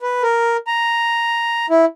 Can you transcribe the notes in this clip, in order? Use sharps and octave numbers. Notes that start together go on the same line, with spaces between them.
B4
A#4
A#5
E4